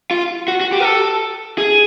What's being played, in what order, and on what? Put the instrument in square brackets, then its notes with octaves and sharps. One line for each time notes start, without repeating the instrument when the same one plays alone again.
[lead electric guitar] F4
F#4
F#4
G4
A#4
A4
G#4